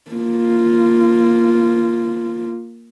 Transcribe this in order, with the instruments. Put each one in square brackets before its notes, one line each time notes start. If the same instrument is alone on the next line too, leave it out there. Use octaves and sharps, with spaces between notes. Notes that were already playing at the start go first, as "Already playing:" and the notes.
[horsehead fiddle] A#3 F4